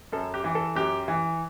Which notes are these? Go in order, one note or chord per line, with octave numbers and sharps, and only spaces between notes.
F#2 A4
G4
E3
A4
F#2 G4
E3